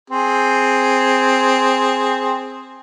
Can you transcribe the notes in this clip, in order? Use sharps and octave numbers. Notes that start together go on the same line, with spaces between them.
C4 G#4